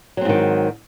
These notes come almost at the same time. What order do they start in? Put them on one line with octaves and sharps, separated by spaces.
F#3 C4 G#2 D#3